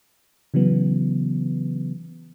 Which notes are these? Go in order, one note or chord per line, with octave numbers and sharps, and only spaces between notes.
C#3 E3 F#3 B3